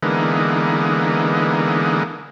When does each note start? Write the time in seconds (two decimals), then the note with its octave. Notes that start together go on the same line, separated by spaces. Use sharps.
0.03 D3 E3 G#3 A#3 B3 D#4